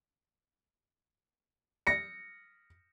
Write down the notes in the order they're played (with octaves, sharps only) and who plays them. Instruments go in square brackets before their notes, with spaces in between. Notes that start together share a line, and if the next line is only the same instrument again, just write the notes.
[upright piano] A#6 C#7